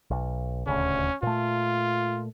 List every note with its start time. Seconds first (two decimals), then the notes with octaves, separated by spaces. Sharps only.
0.11 B1
0.67 D#1 D2 C#3 C#4
1.23 A#2 A3 F4